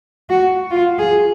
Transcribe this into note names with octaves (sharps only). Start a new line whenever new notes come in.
F#4
F4
G#4